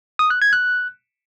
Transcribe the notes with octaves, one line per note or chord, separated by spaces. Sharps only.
D#6
F#6
G#6
F#6